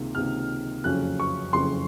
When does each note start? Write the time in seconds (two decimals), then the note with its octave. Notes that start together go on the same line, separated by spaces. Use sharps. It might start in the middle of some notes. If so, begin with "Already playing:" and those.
Already playing: C#2 C3 D#3 A#3
0.15 C#2 C3 D#3 A#3 F6
0.84 F#1 F2 C#3 F#3 C#4 F#6
1.19 C#6
1.53 F#1 F2 C#3 F#3 C#4 C6